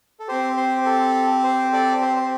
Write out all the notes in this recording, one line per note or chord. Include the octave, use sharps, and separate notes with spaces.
A4
C4 G4 C5
C5
A4
C5
A4 D5
C5
C5